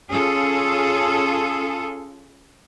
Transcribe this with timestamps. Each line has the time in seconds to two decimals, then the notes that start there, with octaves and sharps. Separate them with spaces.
0.12 C#4 F4 G#4 A4